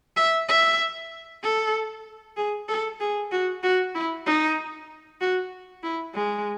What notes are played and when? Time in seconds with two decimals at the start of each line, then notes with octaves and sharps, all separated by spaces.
0.16 E5
0.48 E5
1.43 A4
2.37 G#4
2.68 A4
3.00 G#4
3.31 F#4
3.63 F#4
3.94 E4
4.26 D#4
5.21 F#4
5.83 E4
6.15 G#3